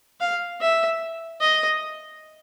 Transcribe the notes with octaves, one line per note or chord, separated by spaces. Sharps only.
F5
E5
D#5